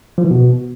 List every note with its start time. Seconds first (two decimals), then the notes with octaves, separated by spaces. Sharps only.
0.18 F3
0.24 E3
0.31 B2